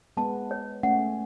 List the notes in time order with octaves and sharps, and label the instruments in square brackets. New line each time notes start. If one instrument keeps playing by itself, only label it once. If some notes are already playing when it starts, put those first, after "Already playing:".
[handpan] G#3 B3 [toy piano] A5
[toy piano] C#5
[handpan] A3 C#4 [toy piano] F#5